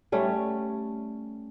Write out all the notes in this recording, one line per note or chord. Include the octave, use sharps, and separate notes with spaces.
G3 A3 C#4